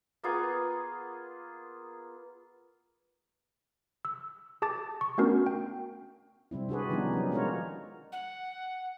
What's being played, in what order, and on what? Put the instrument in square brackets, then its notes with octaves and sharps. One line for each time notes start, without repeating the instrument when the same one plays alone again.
[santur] A#3 B3 F4 G#4
[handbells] E6
G#4 A5 D6 A6
C#6
A3 B3 C#4 D4 F#4 A#4
G5
[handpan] C3 G3 C4 E4
D4 F#4 G#4 B4
D#3 F3 G3 B3 C#4 D#4
F#3 C#4
G#3 D4 F4 F#4 A#4 C#5
[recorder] F#5